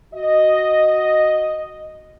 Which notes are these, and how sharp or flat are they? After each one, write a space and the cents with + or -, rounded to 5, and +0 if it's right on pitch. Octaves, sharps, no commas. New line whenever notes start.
F#4 +0 D#5 +0